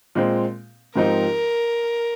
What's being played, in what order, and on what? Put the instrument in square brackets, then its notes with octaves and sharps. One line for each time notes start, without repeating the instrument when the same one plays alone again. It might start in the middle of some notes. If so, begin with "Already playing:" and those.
[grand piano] A#2 G#3 C4
[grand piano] G#2 F3 C4 D#4 G4 [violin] A#4